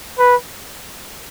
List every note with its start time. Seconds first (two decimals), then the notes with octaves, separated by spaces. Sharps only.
0.18 B4